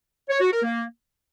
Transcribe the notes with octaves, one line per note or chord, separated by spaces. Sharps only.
C#5
F#4
A#4
A#3